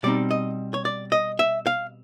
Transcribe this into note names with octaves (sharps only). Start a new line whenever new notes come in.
B2 G3 C4 D#4 D5
D#5
C#5
D5
D#5
E5
F5